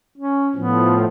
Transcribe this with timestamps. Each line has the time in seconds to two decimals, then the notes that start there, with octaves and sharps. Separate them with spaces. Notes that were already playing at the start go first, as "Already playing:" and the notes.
0.18 C#4
0.55 A2 F3 B3